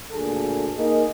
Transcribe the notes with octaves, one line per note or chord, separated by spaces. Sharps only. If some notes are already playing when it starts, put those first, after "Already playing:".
D2 A#2 G#4 A4
A#3 D#4 G#4 A#4